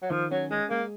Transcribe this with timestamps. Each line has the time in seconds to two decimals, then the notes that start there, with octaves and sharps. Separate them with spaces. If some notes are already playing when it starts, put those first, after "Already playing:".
0.02 F#3
0.11 D#3 F3
0.31 F#3 C#4
0.51 G#3 G#4
0.70 G#3 A#3